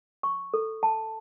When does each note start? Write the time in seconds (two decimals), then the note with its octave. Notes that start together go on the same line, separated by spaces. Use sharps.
0.23 C#6
0.54 A4
0.83 A5